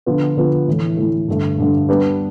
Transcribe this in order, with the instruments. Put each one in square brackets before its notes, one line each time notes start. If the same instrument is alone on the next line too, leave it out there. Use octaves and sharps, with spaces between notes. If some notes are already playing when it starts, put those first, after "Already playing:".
[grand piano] D3 F3 B3 F4
D3 F3 B3 F4
A2 E3 A3
A2 E3 A3
G2 D3 A3
G2 D3 A3
G3 B3 D4 G4 B4